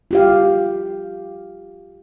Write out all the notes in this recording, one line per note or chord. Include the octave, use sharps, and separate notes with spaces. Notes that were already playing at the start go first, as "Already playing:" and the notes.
F4 G4 F5